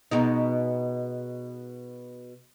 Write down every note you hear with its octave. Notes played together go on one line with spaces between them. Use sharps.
B2 G#3 D#4